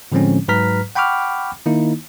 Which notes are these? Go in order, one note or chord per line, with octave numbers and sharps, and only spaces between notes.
A2 D3 F3 G#3 C4 C#4
G#2 F#3 B4 A#5 F6 B6
F#5 G5 B5 C#6 D6 F6
D#3 A#3 D#4 E4